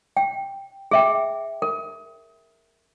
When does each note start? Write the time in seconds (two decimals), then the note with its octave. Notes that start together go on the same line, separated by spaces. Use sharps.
0.17 G5
0.91 G#4 E5 G5
1.62 A#4